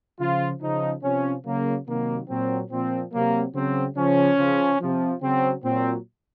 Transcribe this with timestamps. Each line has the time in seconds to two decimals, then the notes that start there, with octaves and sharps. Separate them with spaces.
0.19 C#3 F3 F4
0.61 C#3 F3 D#4
1.03 C3 F3 C#4
1.45 C#3 F#3 A#3
1.87 C3 D#3 F#3 A#3
2.29 A#2 F#3 C4
2.71 A#2 F3 C4
3.12 C3 F#3 A#3
3.54 C#3 F#3 C4
3.96 C#3 F3 C#4
4.38 C#3 F3
4.80 C3 F3
5.21 C#3 F#3 C4
5.63 A#2 F#3 C4